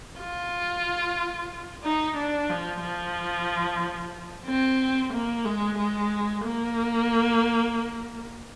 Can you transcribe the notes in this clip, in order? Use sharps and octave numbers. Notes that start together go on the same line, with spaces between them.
F4
D#4
D4
F3
F3
C4
A#3
G#3
G#3
A#3